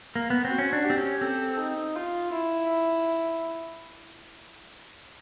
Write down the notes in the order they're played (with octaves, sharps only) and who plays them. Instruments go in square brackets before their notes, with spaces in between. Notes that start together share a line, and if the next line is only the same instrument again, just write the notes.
[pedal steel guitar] A#3
B3
[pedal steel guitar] C4 [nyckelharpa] F#4
[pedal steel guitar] C#4
D4
[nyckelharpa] G4
[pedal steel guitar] C4
C#4
[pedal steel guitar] C4 [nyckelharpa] A4
[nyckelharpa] D#4
F4
E4